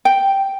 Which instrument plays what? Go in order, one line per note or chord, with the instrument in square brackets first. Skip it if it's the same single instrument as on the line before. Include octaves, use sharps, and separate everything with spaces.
[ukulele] G5